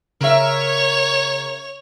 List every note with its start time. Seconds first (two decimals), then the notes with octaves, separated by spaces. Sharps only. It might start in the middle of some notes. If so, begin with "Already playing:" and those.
0.21 C#3 A#4 C#5 E5 F7